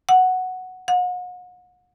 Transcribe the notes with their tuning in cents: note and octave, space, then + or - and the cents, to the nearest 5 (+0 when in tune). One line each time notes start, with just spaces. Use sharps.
F#5 +0
F#5 -40